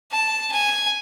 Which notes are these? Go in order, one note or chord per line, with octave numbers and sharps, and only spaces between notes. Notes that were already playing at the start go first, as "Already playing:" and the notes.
A5
G#5